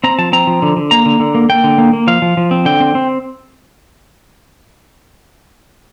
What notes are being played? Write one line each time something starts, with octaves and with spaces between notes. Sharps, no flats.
C4 A#5
F3 A5
C4 A#5
F3
D3
D3
A#3 A#5
D3
D3
A#3
A#3 G5
D3
A#3
A#3
F3 F5
F3
F3
C4
D3 G5
C4
C4